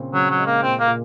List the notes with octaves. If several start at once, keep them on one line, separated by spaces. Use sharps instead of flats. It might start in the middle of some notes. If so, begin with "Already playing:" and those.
Already playing: A#2 C#3 C4
C#3 F#3
F#3
G#3
A#3
A#2 C4
A#3
A#2